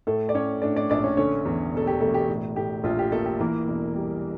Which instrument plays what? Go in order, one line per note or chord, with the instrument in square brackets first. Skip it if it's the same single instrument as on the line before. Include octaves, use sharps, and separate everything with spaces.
[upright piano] A2 A3 A4
D5
A2 C#4 C#5
A2 D4 D5
D4 D5
A#1 D4 D5
C#4 C#5
D3 C#4 C#5
E2
E1 A4
G4
E1 A3 A4
G4
A2
A2 G4
A#1 F4
G4
A3 A#3 A4
G4
E3 A#3 A#4
E1
G3